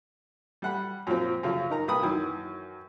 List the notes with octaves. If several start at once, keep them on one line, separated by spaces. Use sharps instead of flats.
G3 F#5 B5
F#2 A#2 F3 C4
F#2 C#3 F3
D#4 A#4 A#5
C2 A#3 B4 B5 D#6
F#2 D#3 E3